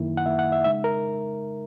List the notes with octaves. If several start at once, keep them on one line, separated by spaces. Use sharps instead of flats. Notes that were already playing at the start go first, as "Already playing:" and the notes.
Already playing: F#2 D#3 A#3 E4
F#5
F#2 D#3 A#3 E4 E5
F#5
E5
C#3 G#3 D#4 E5
A#4